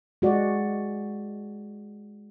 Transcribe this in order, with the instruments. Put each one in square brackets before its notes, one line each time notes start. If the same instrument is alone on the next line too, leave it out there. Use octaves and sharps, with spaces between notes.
[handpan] G#3 F#4 D5